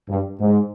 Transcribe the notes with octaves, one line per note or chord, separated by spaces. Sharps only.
G2
G#2